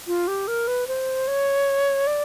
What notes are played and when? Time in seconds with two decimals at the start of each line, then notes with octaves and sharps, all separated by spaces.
0.08 F4
0.28 G4
0.48 A#4
0.68 B4
0.88 C5
1.28 C#5
2.07 D5